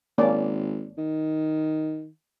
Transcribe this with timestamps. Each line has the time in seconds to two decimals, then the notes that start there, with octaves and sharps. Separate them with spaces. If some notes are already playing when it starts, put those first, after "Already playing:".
0.18 G#1 A#3 C#4 D5
0.98 D#3